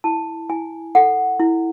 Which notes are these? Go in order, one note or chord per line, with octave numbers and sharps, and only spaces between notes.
E4 A5
E4 G#5
A4 F#5
E4